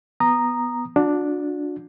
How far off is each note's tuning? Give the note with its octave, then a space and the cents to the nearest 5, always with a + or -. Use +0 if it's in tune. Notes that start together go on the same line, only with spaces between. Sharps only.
B3 +0 A#5 +0 D#6 -15
D4 +0 F#4 -40